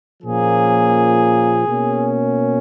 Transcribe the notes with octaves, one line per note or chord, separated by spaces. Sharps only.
A#2 F3 A#3 C#4 G#4
B2 A#3 C#4